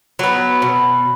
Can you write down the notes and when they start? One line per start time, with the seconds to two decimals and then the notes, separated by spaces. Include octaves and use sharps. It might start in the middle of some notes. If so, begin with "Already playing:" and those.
0.19 F#3 B3
0.62 B2